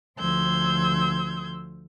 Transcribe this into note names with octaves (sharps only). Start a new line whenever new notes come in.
D2 F3 C6 E6 G6 G#6